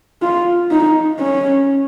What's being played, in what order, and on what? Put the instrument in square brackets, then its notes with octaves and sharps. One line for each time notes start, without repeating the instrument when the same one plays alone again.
[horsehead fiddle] F4
D#4
C#4